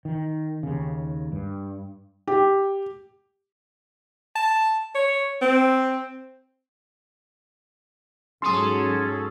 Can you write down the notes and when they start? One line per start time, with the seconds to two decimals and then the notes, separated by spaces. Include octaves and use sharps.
0.05 D#3
0.63 D#2 C#3
1.32 G2
2.28 G4
4.35 A5
4.95 C#5
5.41 C4
8.42 G#2 F#3 C#4 G#4 A4 C6 D#6